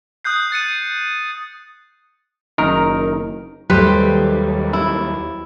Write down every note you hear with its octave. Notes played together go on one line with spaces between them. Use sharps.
D#6 F#6 G6 C7
F#6 A6 C#7 D#7
F#1 D#3 A#4
D#2 F#3 G3 A3 G4 B4 C5
E4